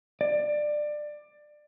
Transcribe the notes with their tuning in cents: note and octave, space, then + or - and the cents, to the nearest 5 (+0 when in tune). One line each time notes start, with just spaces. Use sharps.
D5 +20